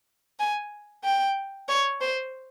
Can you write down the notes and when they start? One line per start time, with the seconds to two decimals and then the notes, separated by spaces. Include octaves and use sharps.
0.39 G#5
1.04 G5
1.69 C#5
2.01 C5